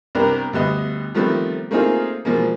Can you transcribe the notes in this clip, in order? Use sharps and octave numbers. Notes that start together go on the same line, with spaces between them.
C2 B3 D4 G4 A#4
D2 G3 B3 D#5
D#3 F3 G3 A3 B3 C4
A3 A#3 C4 D#4 F4 G#4
B2 F3 G#3 A#3